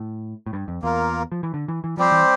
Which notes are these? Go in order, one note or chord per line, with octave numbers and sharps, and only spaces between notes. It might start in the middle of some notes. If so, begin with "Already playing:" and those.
Already playing: A2
A2
G2
F2
E2 A#3 F4 A#4
F3
E3
D3
E3
E3
F3 G3 C4 G4 C5
E3